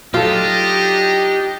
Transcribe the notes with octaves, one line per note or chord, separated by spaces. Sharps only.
F#3 D4 D#4 F4 G4 A4 D#5